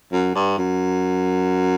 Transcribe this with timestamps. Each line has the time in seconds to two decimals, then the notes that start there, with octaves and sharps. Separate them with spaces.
0.13 F#2
0.35 G2
0.58 F#2